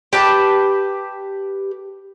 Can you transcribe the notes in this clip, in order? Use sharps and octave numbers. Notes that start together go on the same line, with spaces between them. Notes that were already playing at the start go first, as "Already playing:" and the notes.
G4 B4 A5